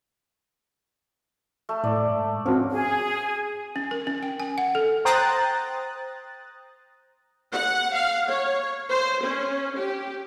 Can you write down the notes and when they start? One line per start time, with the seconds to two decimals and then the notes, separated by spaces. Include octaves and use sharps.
1.69 A3
1.84 A2 D5
2.10 G#2
2.46 F3 A#3 C4 C#4 F#4
2.70 G#4
3.76 C#4
3.91 A#4
4.07 C#4
4.23 G5
4.40 G#5
4.58 F#5
4.75 A4
5.05 C5 G5 A#5 D#6 F#6 A6
7.53 F#5
7.94 F5
8.29 C#5
8.90 C5
9.23 C#4
9.76 G4